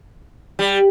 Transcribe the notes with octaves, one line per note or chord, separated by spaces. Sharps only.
G3